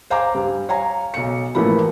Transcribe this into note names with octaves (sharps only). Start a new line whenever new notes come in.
C5 F5 G#5 A#5 D6
G2
C#5 F5 G#5 A#5
B1 C#7
A1 E3 F3 A3 A#3 B5